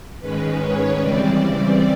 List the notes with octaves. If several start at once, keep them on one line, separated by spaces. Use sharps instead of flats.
G#2 D#3 G#3 C#4 B4
C#5
C#3 E3 G3 C4 D5